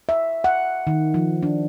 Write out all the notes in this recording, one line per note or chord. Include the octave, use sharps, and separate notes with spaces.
E5
F#5
D#3
F3
D4